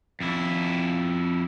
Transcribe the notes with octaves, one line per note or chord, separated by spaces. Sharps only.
F2 E4